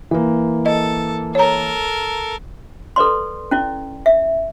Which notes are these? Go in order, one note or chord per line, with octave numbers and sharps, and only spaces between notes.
E3 A#3
A4 D#5
A4 A#4 C#5 A#5
A4 B4 D5 C6
C#4 E4 D5
E5